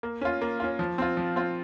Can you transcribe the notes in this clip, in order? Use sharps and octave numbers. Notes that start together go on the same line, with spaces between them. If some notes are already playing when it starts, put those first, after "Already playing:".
A#3
C#4 F4
A#3
C#4 F4
F3
C4 F4
F3
C4 F4